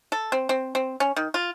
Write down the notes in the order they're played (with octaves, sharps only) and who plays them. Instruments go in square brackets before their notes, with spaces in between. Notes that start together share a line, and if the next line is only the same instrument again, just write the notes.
[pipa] A4
C4
C4
C4
C#4
D#3
F4